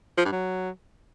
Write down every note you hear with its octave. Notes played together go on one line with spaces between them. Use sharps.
F3
G2
F#3